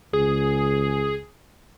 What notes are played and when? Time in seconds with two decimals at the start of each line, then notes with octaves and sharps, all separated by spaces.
0.13 C#2 G#4